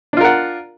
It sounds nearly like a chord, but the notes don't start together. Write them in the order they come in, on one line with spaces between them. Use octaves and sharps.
D4 F4 A#4 F#5